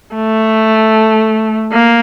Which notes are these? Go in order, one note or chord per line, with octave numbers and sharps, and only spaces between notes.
A3
A#3